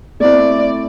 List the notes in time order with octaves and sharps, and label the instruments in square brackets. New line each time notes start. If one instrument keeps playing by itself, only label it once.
[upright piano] A3 C4 E4 [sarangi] D5